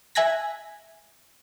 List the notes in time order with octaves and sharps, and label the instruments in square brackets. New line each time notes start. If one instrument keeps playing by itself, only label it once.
[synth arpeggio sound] E5 G#5 F#6 G#6 A#6 B6